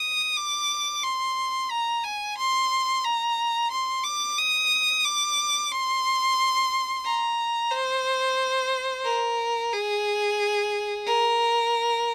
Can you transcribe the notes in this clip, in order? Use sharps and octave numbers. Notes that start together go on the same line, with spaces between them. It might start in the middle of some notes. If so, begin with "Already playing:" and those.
Already playing: D#6
D6
C6
A#5
G#5
C6
A#5
C6
D6
D#6
D6
C6
A#5
C5
A#4
G#4
A#4